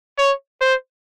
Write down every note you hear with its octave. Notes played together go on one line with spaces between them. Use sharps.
C#5
C5